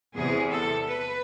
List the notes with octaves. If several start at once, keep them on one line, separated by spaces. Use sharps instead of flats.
E2 C3 E3 G#4
A4
B4